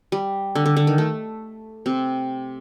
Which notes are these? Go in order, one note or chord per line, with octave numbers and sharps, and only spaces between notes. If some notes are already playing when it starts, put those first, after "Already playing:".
G3
D3
D3
D3
D#3
A3
C3 C4